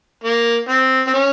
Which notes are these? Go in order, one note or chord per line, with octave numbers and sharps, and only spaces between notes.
A#3
C4
C4
C#4